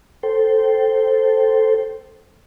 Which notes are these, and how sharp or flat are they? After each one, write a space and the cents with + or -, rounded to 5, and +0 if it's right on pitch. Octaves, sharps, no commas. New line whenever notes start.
A4 +0 C5 +0 G5 -10